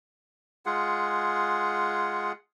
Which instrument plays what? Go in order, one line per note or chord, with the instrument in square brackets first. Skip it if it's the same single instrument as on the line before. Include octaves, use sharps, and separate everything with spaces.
[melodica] G#3 F4 G#4 F#5